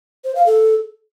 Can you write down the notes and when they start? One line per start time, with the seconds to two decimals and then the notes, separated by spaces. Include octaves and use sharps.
0.24 C5
0.35 F5
0.46 A4